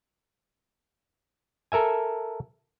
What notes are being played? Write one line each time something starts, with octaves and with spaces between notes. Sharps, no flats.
A4 A#4 E5 G#5